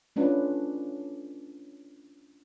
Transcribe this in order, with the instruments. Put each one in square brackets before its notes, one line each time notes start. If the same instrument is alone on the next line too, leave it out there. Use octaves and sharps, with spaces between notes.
[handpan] A3 C#4 D4 F4 B4